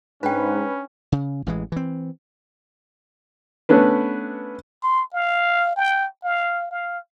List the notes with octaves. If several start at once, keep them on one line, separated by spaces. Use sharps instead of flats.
G#2 C#4 D4 B4 G5
C#3
A1 E3 G#3
E3 C4
A3 B3 C#4 D4 B4
C6
F5
G5
F5
F5